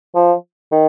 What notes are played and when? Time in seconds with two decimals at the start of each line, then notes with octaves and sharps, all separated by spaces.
0.15 F3
0.72 D#3